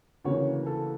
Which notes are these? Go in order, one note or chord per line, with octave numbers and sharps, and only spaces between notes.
D2 C#3 E3 A#3 C#4 C#5
A4